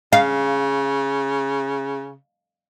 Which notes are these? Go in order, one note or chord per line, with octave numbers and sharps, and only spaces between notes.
C#3 F5